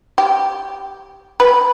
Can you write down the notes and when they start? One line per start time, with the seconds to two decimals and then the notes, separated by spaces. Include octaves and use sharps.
0.18 G4
1.40 B4